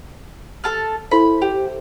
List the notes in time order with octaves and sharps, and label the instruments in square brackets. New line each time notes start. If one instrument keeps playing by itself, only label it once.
[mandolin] A4 A5 F6
[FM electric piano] E4 A4 C5 [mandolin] B5
[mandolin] G4